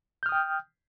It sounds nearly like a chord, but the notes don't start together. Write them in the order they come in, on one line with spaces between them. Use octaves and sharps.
G6 F6 D#6 G5